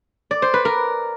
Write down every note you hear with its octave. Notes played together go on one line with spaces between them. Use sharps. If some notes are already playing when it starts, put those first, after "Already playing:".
D5
C5
B4
A#4